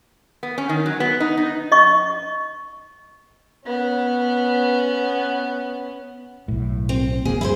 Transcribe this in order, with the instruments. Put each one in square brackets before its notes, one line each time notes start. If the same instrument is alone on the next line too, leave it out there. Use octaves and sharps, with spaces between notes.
[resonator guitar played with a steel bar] B3
C#4
D#3
F#3
B3
D#4
D#4
[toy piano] D#5 C#6
[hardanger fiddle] B3 C#4
[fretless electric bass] B1 A2
[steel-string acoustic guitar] C4
[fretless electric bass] D1 C#2 A#3 [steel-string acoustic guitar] G#4
[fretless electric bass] G2 [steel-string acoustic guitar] E4 G#4 C5